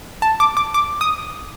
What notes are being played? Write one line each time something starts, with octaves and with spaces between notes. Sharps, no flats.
A5
D6
D6
D6
D#6